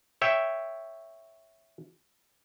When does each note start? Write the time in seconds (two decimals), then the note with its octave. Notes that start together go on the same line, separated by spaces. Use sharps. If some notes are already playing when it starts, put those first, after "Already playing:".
0.22 C#5 E5 G5